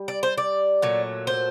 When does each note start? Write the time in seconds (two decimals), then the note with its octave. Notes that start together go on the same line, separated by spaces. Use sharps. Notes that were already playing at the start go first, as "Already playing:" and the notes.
Already playing: G3
0.08 D5
0.23 C5
0.38 D5
0.82 A#2 F#3 A3
1.27 C5